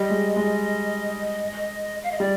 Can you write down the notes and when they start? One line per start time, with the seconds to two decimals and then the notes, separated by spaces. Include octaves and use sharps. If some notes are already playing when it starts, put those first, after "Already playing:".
Already playing: G3 D#5
0.10 G#3
0.36 G#3
2.04 F5
2.11 D#5
2.20 G3 D5